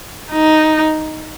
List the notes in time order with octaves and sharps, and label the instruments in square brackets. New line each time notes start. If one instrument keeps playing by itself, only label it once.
[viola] D#4